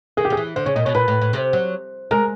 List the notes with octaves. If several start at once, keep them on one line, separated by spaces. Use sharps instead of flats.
D#3 G#4
G4
D#3 G#4
E3
D3 C5
C#3 C#5
A#2 D#5
B2 C#5
A#2 B4
A2
A2
C3
F#3
G#3 A#4